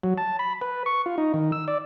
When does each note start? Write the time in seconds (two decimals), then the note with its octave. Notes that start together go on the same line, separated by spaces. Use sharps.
0.03 F#3
0.18 A5
0.39 B5
0.61 B4
0.86 C#6
1.06 F4
1.18 D#4
1.34 D#3
1.52 E6
1.68 D5